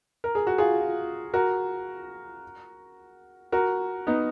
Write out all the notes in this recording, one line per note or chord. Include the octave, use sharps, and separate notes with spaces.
A#4
G#4
F#4
F4 G#4
F#4 A#4
F#4 A#4
B3 D#4